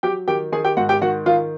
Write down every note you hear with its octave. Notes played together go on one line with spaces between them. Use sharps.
F#3 G4 G5
D#3 G4 G5
D#3 G#4 G#5
G4 G5
G#2 F#4 F#5
G4 G5
D#3 F#4 F#5
D#3 F4 F5